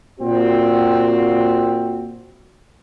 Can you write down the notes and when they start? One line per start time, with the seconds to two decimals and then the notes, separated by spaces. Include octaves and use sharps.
0.20 A#2 C4 F#4